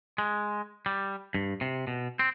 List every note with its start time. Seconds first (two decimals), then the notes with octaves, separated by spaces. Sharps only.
0.18 G#3
0.86 G3
1.34 G2
1.61 C3
1.87 B2
2.19 C4